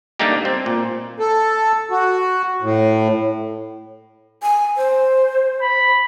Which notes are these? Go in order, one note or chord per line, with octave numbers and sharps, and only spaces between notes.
G3 A3 A#3 D4 D#4 G4
C4
A#2
A4
F#4
A2
G#5
C5
B5